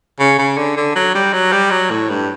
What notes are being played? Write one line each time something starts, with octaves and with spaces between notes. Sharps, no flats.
C#3
C#3
D3
D3
F#3
G3
F#3
G3
F#3
A2
G2